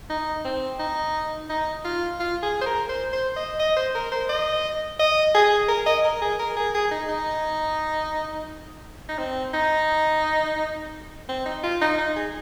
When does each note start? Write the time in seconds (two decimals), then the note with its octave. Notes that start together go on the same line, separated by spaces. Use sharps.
0.10 D#4
0.44 C4
0.79 D#4
1.49 D#4
1.84 F4
2.19 F4
2.43 G#4
2.61 C5
2.66 A#4
2.89 C5
3.13 C5
3.36 D#5
3.59 D#5
3.76 C5
3.95 A#4
4.12 C5
4.29 D#5
4.99 D#5
5.34 G#4
5.68 A#4
5.86 D#5
6.04 A#4
6.22 G#4
6.39 A#4
6.56 G#4
6.74 G#4
6.91 D#4
7.09 D#4
9.09 D#4
9.18 C4
9.54 D#4
11.29 C4
11.46 D#4
11.63 F4
11.81 D#4
11.99 D#4
12.16 G#4